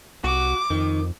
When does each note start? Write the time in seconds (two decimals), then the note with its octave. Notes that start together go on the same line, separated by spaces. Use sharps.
0.24 C2 F#4 D6
0.70 F2 D#3